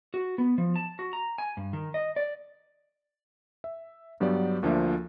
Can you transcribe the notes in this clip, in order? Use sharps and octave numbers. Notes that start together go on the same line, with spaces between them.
F#4
B3
F3
A5
F#4
A#5
G#5
G2
D#3
D#5
D5
E5
G2 F#3 B3 G4 D5
D2 F3 A#3 D4 F4 E5